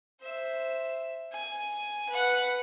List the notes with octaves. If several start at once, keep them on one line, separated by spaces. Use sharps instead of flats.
C5 E5
G#5
B4 F#5